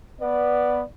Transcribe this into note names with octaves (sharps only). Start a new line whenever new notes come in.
B3 D5